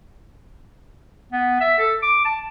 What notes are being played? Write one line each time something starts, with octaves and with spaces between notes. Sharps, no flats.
B3
E5
A4
D6
A5